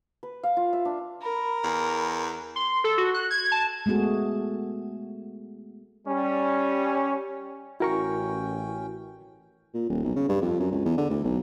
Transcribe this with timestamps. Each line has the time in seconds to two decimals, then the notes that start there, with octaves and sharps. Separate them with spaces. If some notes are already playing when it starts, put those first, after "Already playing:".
0.23 B4
0.43 F5
0.57 F4
0.73 E5
0.85 D4
1.22 A#4 B5
1.64 E2
2.56 C6
2.84 A4
2.98 F#4
3.14 F#6
3.30 G#6
3.52 A5
3.86 G#3 A3 B3 F#4 G#4
6.08 G3 C#4
7.80 A1 C#4 E4 F#4 A#4 G5 C#6
9.74 A#2
9.89 D#1
10.04 B1
10.16 C#3
10.29 G2
10.42 F2
10.60 F#2
10.71 C#2
10.85 E2
10.97 D3
11.10 D2
11.24 B1